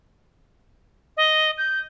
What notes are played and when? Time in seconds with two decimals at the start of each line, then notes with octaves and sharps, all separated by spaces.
1.17 D#5
1.58 G6